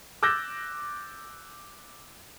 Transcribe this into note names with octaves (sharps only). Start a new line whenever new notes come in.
D6 E6 F#6 G6 A6 A#6